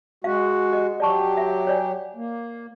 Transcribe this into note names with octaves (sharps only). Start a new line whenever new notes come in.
G#3 F#4 F5
G4 D#5
F#3 G4 D5 A5 C#6
E5
C#5 D5 G#5
A#3